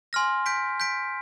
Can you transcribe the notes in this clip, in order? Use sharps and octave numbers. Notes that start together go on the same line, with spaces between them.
G#5 C6 F6 A#6
G6 B6 D7
G6 B6 D7